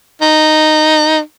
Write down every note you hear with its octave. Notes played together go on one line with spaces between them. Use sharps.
D#4